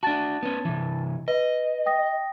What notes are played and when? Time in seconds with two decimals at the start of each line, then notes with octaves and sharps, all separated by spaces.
0.03 D4 F#4 A5 A6
0.43 B3 C#4
0.65 C3 E3
1.28 B4 D#5
1.86 G5 D#6 A#6